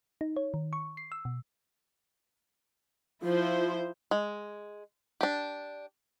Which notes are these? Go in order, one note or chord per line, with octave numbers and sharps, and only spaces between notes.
D#4
C#5
D#3
C#6
C7
E6
B2
F3 E4 F4 C5
G#3
D4 G4